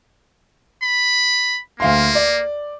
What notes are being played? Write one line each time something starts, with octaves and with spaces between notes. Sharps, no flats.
B5
D2 A#3 F5 C6
D5